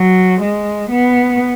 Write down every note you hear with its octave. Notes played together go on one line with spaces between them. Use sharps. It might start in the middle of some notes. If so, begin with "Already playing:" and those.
Already playing: F#3
G#3
B3